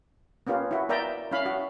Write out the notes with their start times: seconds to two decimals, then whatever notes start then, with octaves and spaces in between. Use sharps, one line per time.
0.47 A#3 B3 C#4 F4 G4
0.71 E4 F#4
0.89 B3 A#4 D5 E5 G5 A#5
1.31 C#4 E4 F5 B5
1.46 F#4